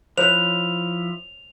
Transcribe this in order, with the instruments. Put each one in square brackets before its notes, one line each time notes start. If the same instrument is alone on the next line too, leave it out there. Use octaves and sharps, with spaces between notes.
[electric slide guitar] F3 E4 [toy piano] C5 C#5 [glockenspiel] F7